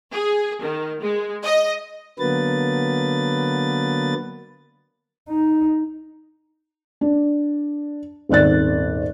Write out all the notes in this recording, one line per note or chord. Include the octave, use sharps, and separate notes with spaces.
G#4
D#3
G#3
D#5
D3 F#3 A#3 B3 B4 A6
D#4
D4
D#1 G#1 D5 F#6 A6